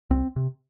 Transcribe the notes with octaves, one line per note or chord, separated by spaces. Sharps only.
C2 C4
C3